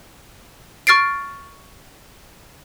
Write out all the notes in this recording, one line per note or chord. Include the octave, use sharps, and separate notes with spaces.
C#6 F6 A6 C7 D7